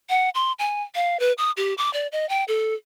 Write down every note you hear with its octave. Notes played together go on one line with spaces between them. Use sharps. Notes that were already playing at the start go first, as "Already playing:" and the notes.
F#5
C6
G#5
F5
B4
D#6
G4
D6
D5
D#5
G5
A4